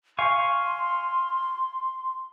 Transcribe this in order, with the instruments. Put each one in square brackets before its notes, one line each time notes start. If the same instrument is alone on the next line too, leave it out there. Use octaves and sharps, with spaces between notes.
[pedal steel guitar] F5 G#5 C#6 [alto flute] C6